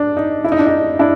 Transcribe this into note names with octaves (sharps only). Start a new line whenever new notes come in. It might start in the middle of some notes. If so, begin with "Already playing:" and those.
Already playing: D4
D#4
E4
D#4
D4
D#4
D4 E4